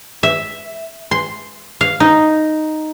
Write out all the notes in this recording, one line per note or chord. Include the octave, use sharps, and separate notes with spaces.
E5
C6
F5
D#4